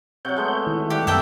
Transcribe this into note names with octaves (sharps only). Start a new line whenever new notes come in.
C3 F#3 C#5 F#5 G6
G#3 A3 B3
D#3 E4
G3 G4 F#5 D6
F#2 C3 A3 A#3 E5 G5